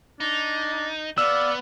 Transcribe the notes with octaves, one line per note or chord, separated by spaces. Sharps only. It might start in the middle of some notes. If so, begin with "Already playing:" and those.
D4 D#4
B3 D5 F5 E6